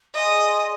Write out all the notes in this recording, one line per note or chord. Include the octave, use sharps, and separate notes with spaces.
G#4 D5 D#5 G#5 C6